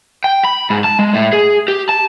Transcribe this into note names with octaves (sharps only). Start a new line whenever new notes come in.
G5
B5
G#2
A5
G#3
A2
G#4
G4
A5